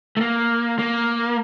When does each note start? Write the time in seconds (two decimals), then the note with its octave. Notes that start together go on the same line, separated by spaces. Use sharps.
0.17 A3
0.21 A#3
0.79 A#3